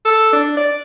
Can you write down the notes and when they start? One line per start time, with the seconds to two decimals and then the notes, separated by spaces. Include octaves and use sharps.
0.05 A4
0.33 D4
0.57 D5